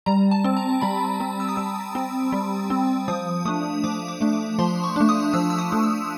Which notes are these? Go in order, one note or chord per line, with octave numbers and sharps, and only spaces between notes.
G3 A#5
A5
C4
A#5
G3 B5
C4
E6
D#6
G3 E6
C4
G3
C4
F3 D#6
A3 D4 D#6
F3 D6
D6
A3 D4
D6
F3 C6
C#6
A3 D4
D#6
F3 E6
E6
D#6
A3 D4
E6